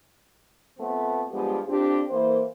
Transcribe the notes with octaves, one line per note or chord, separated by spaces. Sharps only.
F3 A3 B3 C4
G2 F3 G#3 B3 G4
F2 C4 D4 F4 G4
E3 A#3 C5